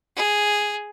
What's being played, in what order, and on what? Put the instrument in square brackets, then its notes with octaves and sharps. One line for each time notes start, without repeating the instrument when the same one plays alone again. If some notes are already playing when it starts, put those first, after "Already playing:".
[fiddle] G#4